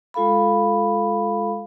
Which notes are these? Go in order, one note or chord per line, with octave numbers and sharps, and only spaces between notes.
G#3 F4 A4 F5 B5